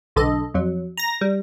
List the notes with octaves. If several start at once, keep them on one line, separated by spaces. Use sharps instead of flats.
B1 D3 A4 D#5
F2 F#3
A#5 A#6
G3